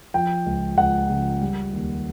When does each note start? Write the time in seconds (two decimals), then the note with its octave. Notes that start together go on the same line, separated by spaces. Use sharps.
0.14 F3 G5
0.46 C#2
0.78 C#2 F#5
1.10 C#3
1.41 G3
1.73 D#2